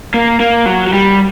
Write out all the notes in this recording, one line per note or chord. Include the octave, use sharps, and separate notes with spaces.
A#3
A#3
F#3
F#3
G3